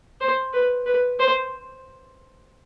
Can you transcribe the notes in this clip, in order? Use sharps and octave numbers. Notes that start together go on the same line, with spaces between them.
C5
B4
B4
C5